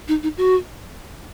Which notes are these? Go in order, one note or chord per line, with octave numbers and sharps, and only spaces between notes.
D#4
D#4
F#4